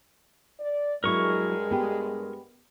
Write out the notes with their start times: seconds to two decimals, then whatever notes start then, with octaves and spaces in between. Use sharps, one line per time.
0.60 D5
1.04 G2 F#3 G#3 E4 A#4 C#6
1.71 B3 G4